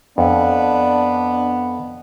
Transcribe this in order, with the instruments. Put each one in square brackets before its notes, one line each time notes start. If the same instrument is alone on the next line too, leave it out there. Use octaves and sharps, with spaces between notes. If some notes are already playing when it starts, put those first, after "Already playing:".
[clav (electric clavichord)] F2 [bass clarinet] B3 [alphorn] D4